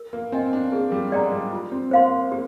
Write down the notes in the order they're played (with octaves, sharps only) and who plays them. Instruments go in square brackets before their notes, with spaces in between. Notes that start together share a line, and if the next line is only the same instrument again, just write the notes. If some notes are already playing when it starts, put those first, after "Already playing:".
Already playing: [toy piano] A#4
[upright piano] A#3
[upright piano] C4 [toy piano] D#5 G#5
[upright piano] D4
[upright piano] A#3 [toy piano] G#4
[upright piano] G3
[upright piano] G#3 [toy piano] D5 G5 A#5
[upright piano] G3
[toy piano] F4
[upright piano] C4
[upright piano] A#3 [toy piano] C5 F5 C6
[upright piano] A#3 [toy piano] G4